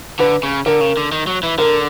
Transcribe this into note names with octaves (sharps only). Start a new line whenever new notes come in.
D3 B4
C#3
D3 A#4
C#3
D3
D#3
F#3
E3
D3 A#4